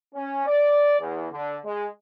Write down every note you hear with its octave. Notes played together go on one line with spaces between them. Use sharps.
C#4
D5
E2
D3
G#3